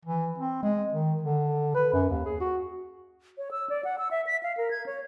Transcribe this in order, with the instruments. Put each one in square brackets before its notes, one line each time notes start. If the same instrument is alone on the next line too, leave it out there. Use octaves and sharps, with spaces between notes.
[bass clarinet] E3
C4
G#3
D#3
D3
B4
F#2
D#2
G#4
F#4
[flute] C#5
E6
D5
F#5
E6
E5
B6
F5
A#4
G#6
C#5